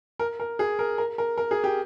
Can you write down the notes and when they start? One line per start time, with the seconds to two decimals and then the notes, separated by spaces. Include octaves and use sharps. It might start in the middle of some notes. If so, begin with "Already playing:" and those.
0.19 A#4
0.40 A#4
0.59 G#4
0.79 A#4
0.98 A#4
1.18 A#4
1.38 A#4
1.51 G#4
1.64 G4